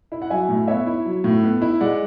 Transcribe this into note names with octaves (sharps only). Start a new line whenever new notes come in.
E4
F#5
F#3 E5 G#5
A2
B3 C#5 E5
E4
F#3
A2
B3
E4
G#3 D5 F#5